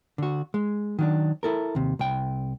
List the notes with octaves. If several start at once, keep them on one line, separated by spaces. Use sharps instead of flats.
D3 F#4
G#3
D#3 F#3 D4
E4 A4 A#4
D#2 C3
C2 G5